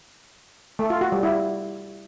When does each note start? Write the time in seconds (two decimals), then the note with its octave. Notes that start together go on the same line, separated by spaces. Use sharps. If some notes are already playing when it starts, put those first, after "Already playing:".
0.79 A3
0.90 F4
1.01 F#4
1.12 G3
1.23 E4